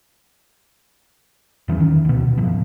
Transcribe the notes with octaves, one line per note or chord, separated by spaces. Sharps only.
E2 E3 F#3 C#4
D#3
D2 B2
F#1 A2 F3